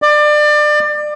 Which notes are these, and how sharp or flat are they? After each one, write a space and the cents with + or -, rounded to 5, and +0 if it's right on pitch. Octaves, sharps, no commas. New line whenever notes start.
D5 +25